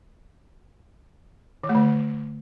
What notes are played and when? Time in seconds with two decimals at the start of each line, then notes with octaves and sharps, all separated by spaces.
1.64 D#3
1.69 A3
1.75 D3